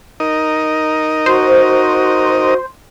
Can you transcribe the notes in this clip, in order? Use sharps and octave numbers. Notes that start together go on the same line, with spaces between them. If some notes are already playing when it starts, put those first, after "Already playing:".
D#4 A#4 D#5
F#4 C5